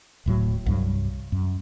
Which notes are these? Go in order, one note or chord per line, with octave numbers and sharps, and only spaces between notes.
D1 A2 F#3
C2 G2 F#3
F#2